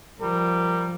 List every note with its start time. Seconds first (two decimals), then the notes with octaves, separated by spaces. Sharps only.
0.20 F3 G3 A#4